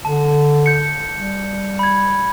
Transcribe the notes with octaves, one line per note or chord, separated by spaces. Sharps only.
D3 A5
G6 C#7
G3
B5 G#6